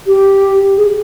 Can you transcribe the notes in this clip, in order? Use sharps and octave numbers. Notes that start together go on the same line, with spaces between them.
G4
G#4